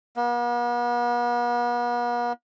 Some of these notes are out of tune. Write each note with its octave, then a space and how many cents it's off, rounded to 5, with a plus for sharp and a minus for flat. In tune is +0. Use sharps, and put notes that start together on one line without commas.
B3 -45